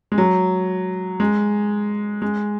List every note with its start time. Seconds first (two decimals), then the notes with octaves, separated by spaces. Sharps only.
0.12 G#3
0.18 F#3
1.20 G#3
2.22 G#3